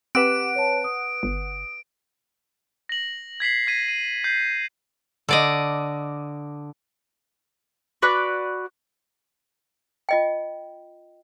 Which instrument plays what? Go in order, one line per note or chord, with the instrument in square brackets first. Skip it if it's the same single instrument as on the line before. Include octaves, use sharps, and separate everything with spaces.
[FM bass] C4 [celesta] G4 D6 E7 [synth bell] B4 F#5 F#6 [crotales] D7
[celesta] C#5 A5
D#6
[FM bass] G1
[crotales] A#6 F#7
G#6 B6 C7 F#7
G#6 A#6 B6 D#7
D#7
G6 C7
[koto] D3 D5 D#5
[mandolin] F#4 B4 D5 F#6
[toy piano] F4 D#5 G5